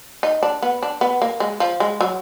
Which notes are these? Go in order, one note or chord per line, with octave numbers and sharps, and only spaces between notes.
D#4
D4
B3
D4
B3
A#3
G#3
F3
G#3
F#3